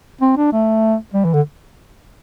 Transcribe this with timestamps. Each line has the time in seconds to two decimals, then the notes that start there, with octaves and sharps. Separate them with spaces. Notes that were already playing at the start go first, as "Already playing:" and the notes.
0.21 C4
0.36 D4
0.52 A3
1.14 G3
1.24 E3
1.34 D3